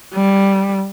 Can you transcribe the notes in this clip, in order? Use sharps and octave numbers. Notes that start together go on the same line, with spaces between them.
G3